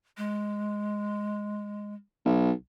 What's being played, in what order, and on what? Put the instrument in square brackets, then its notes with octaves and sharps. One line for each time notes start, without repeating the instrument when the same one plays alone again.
[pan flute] G#3
[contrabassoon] B1